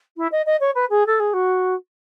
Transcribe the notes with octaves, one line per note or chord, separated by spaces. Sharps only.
E4
D#5
D#5
C#5
B4
G#4
A4
G#4
F#4